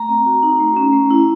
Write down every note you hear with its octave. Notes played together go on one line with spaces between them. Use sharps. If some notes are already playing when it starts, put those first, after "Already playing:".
Already playing: A3 A#5
C4
F#4
D#4
A3
C#4
A3
E4